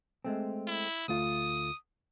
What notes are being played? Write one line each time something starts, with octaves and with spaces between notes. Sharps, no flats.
G#3 A3 C4
E4
D2 A3 F4 D#6